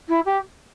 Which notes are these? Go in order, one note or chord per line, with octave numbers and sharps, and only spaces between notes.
E4
G4